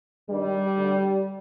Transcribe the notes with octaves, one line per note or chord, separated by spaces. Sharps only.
G2 D#3 G3
D2 D3